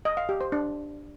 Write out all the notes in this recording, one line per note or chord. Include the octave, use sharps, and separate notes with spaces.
D#5
F5
G4
C5
D4